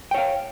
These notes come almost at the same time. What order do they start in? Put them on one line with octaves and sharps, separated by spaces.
G5 C#5 F5